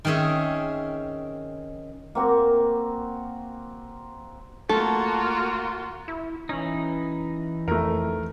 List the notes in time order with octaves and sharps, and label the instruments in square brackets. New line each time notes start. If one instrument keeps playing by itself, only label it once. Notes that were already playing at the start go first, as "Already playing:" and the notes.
[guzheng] D#3 C4 C#4 G#4 E5
[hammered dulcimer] A#3 C4 F#4
[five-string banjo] A3 A4 [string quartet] A#3 F4 F#4
[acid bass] E4
[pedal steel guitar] E3 D#4 [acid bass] C#4
[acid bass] F2 [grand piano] A3 A#4